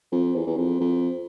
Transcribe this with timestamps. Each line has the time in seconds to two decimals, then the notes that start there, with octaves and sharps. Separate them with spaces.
0.12 F2
0.35 E2
0.47 E2
0.57 F2
0.80 F2